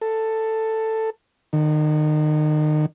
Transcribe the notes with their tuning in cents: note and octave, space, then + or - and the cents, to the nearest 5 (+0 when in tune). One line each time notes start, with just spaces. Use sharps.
A4 +10
D#3 -35